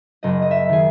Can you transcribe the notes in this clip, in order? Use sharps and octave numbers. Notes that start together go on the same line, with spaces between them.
F#1 D#5
D#5
E5
D#3 G#4